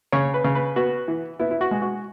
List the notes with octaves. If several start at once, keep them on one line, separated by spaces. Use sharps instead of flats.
C#3 C#5
B4
C#3
B4
B3 F#4
E3
B3 E4
E4
F#4
G#3
F#4